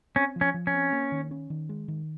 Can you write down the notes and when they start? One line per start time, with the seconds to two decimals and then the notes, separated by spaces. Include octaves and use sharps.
0.16 C4 C#4
0.36 F3
0.41 C#4
0.54 F3
0.67 C#4
0.74 C4
0.93 A#3
1.12 D#3
1.31 C#4
1.50 D#3
1.69 G#3
1.88 D#3